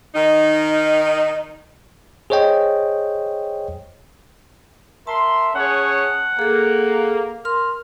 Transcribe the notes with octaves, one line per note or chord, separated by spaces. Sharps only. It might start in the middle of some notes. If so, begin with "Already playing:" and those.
D#3 D#4
G#4 C5 C#5 D#5 G5
A#4 E5 A5 C6
C#4 G#4 C#5 F#5
A#3 G#4 A4
A#4 C6 F6